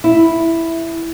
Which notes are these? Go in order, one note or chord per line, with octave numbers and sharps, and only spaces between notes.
E4